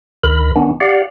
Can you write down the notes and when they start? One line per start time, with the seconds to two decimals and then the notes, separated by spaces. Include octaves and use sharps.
0.24 D2 D#3 A#4 B5
0.56 D#3 B3 C#4 D4
0.80 G4 D5 F5 F#5